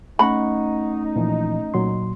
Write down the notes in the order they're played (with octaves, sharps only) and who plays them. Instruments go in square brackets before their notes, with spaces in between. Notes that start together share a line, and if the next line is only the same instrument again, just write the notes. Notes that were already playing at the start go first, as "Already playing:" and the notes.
[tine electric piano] A3 C#4 [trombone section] D#4 [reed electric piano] F#5 C#6 [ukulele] B5
[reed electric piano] A#2 E3 F3
A#2 F#3 C6